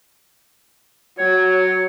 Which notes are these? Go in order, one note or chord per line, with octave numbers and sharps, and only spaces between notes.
F#3 C#5